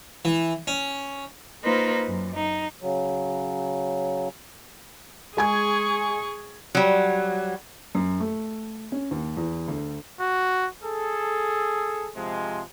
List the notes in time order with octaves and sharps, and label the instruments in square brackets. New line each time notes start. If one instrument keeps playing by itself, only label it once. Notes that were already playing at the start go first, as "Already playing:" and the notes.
[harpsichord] E3
C#4
[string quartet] A#3 D#4 F4 B4 C5
F#2
D#4
[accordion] C#3 F#3
[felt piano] G#3 G#5 G#6 [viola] G#4 C#6
[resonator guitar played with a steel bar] F#3 G3
[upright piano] F#2
A3
C#4
D#2
E2
D2
[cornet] F#4
[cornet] G#4 [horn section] A4
[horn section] C3 F3 G#3